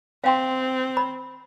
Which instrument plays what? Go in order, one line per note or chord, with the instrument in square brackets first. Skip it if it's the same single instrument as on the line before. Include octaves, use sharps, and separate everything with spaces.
[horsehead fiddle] C4 [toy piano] F5 G5 C6
[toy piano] B5